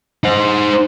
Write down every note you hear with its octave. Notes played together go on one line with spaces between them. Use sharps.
D#4 C5